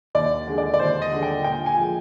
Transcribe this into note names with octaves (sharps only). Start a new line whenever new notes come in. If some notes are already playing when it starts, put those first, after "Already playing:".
D#2 D5
D3 G#3
D5
D5
D#2 C5
D#5
D3 G#3
G5
A#2 G5
G#5
F3 G#3